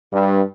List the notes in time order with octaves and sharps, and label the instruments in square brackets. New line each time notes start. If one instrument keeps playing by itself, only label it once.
[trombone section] G2